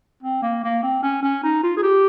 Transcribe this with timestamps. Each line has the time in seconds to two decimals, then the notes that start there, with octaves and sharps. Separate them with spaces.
0.23 C4
0.42 A#3
0.63 A#3
0.83 C4
1.03 C#4
1.23 C#4
1.43 D#4
1.63 F4
1.77 G#4
1.83 G4